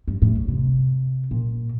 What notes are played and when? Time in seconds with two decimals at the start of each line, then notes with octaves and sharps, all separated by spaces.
0.08 G2
0.22 A2
0.48 C3
1.31 A#2